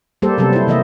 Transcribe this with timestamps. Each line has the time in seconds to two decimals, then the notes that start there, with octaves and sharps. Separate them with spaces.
0.22 G3 A#3 G4 A4 C5
0.38 C3 F#3 G3 B3 A4
0.53 E4 C5
0.67 C3 E3 A3 A#3 D#5 E5